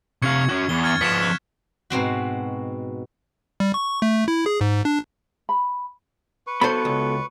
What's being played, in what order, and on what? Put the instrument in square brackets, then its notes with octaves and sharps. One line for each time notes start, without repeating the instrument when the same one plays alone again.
[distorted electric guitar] C3 F5 [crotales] C#6 G#6 C#7
[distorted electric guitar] C#4 F#4
[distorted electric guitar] E2 [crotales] G7
[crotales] F6 G#6 A6
[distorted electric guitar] F3 B3 [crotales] B6 C#7 E7
[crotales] F#6
[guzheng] G#2 B2 C4 F#4
[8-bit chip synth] G3
C#6
A3
E4
G#4
G#2
D4
[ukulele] B5
[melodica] B4 C#6
[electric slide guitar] B3 F#4 A4 [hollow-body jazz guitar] C5 B5
[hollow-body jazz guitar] C#2